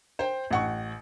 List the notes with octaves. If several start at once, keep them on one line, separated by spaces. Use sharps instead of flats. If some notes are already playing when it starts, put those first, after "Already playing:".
C5 G5
A1 F#5 C#6